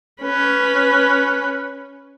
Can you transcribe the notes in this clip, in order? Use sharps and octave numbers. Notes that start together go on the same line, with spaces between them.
C#4 B4